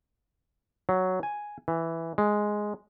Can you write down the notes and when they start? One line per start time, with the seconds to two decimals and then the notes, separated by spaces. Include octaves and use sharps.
0.89 F#3
1.23 G#5
1.68 E3
2.18 G#3